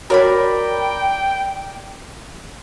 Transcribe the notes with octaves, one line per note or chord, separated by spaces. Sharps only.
F#4 A#4 C#5 D5 G5 B5